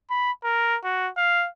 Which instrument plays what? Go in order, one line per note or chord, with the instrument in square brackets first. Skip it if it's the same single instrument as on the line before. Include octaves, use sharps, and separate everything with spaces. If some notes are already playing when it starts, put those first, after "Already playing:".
[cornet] B5
A#4
F#4
F5